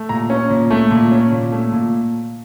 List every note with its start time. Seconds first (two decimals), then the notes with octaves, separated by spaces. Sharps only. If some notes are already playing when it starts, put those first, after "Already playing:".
Already playing: A3
0.09 A#2 A#5
0.30 C#4
0.50 A#2
0.71 A3
0.91 A#2
1.11 C#4
1.32 A#2
1.52 A3
1.73 A#2